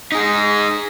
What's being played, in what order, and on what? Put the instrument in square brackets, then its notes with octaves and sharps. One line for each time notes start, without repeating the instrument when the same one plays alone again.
[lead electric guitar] D#4 G#4